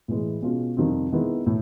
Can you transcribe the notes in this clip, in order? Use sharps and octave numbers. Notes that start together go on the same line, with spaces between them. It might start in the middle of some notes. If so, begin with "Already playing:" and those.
A2 E3 G#3
B2 G#3 C#4 F4
F2 C3 D#3 G3 C4
D#3 G#3 B3 E4
A2